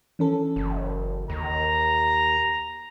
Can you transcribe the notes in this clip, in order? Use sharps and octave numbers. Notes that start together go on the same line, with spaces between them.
E3 C#4 A4
F#1
D#2 A#5